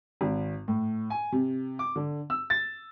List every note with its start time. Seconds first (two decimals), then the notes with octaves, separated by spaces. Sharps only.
0.21 G#1
0.68 A2
1.10 G#5
1.32 C3
1.79 D6
1.96 D3
2.30 E6
2.50 A6